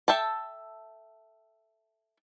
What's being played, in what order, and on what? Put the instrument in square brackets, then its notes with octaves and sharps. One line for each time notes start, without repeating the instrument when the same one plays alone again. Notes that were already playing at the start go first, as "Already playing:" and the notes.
[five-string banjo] A4 E5 G5 A5